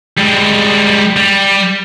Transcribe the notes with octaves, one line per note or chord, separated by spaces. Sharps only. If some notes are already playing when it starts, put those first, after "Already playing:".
G3 G#3
G3